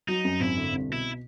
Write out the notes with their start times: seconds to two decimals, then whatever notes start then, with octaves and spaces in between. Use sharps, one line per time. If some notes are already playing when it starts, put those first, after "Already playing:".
0.08 F#3 D#4
0.25 F#2
0.40 G#1 E4
0.57 D3
0.72 C2
0.88 B2 E4